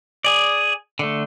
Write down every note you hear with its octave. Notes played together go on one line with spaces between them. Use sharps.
G#4 D5
D3 A3